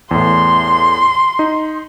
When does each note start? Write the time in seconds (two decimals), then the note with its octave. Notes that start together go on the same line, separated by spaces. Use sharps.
0.11 E2 A2 C6
1.39 D#4